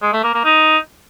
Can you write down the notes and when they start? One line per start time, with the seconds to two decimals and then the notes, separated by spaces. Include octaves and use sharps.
0.02 G#3
0.13 A3
0.24 A#3
0.34 A#3
0.45 D#4